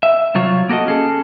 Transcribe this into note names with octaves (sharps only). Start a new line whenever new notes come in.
E5
C2 F#3 F4 C#5
A#3 F#4 A4 D#5
C#4 G#4 A4